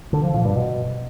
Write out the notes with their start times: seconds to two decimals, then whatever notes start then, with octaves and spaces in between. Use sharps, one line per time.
0.13 D3
0.23 F3
0.34 A#2
0.45 G2
0.56 B2